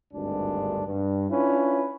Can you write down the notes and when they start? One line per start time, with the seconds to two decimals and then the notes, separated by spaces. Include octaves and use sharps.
0.13 G#1 D2 G2 G#3 D4
0.86 G2
1.29 C#4 D4 E4 F4 B4